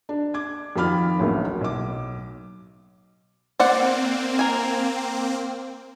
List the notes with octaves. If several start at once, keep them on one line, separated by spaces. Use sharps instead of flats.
D4
D6 G#6
F2 D#3 F4 B5 D6 F6
A1 D2 F#3 A#3
B1 D6
A#3 C4 C5 D5 F#5
A#4 G#5